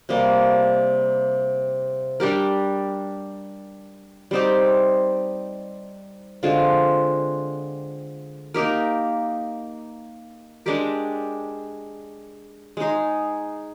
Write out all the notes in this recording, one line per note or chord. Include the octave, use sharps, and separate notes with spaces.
C3 G3 A#3
G3 D4 G4 A#4
G3 C4 D#4 G4
D3 G#3 C4 F4
A#3 D#4 G4 A#4
G#3 D4 G4 A#4
G#3 D#4 G#4